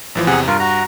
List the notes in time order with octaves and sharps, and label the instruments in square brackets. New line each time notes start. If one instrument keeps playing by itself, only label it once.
[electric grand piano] A1 E3 F3
[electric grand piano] E2 C3 [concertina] G#4 F#5
[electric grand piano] G2 [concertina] F4 A#4
[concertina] F#4 A#5